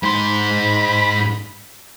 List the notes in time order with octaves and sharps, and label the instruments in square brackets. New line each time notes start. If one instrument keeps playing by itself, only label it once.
[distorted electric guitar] G#2 C6 [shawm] B5